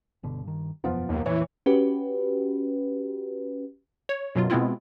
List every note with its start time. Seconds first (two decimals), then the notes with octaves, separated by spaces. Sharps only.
0.23 G1 B2 D3
0.43 G2 D#3
0.84 E1 F#2 F3 B3 F4
1.09 D#2
1.26 F2 A#2 E3 C#5
1.66 C#4 F#4 G4 B4
4.09 C#5
4.35 F#2 B2 F#3 F4
4.50 B2 G#3 B3 C4 E4 F4